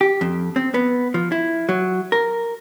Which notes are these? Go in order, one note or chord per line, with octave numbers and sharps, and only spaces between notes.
G4
F2
C4
B3
F3
E4
F#3
A#4